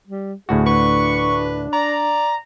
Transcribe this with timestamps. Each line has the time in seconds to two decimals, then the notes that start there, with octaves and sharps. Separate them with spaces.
0.07 G3
0.49 D2 A2 F#4 G#4
0.66 D4 B4 C#6
1.73 D5 A#5